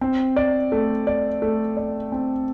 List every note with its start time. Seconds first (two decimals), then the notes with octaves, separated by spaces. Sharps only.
0.01 C4
0.36 D5
0.72 A3
1.07 D5
1.42 A3
1.77 D5
2.12 C4